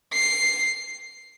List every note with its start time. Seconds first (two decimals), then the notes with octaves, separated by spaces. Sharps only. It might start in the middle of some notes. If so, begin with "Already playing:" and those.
0.13 C7